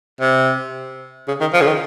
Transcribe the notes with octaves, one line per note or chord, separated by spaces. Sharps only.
C3
C#3
D#3
F3
C#3
D#3